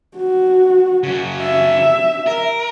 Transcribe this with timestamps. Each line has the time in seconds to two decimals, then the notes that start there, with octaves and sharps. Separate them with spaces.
0.17 F#4
1.03 C#3 F#3
1.42 E5
2.27 A#4